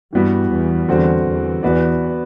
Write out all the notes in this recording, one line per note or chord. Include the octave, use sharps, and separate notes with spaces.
G2 E3 G3 B3 F#4
E2
E2 D3 G3 C4 F#4
E2
E2 B3 F#4 B4 D5